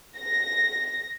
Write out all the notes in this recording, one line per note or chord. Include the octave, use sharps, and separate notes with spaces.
A#6